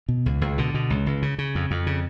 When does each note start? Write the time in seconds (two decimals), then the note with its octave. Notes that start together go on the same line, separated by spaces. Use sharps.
0.09 B2
0.26 C#2
0.41 C#2
0.58 B2 D3
0.74 B2
0.90 C#2
1.06 C#2
1.22 C#3
1.38 C#3
1.55 F2
1.71 F2
1.87 C#3